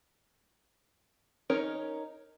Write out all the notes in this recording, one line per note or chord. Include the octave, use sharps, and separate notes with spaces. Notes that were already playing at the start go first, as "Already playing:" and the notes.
C#4 D#4 A#4 C#5